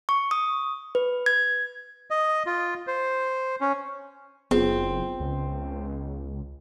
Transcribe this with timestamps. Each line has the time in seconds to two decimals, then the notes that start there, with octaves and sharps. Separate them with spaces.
0.09 C#6
0.31 D#6
0.95 B4
1.26 G#6
2.10 D#5
2.46 F4
2.87 C5
3.61 C#4
4.51 F#1 B3 C4 F4 G#4
5.20 C#2